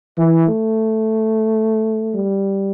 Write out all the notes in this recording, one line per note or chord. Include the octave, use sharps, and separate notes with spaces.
E3
A3
G3